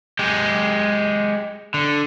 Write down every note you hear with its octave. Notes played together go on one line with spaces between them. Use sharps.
G#3 G4
D3